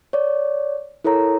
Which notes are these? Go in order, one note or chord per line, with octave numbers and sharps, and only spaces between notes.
C#5 D5
E4 A4 A#4 C#5 A#5